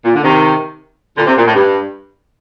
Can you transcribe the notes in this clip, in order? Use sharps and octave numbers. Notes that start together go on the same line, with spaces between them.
A#2
D3
C3 D#3
A#2 D3
C3
A#2
A2
G2